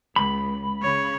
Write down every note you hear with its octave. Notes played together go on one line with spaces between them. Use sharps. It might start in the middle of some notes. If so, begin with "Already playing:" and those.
C#2 B5
C#3 C#5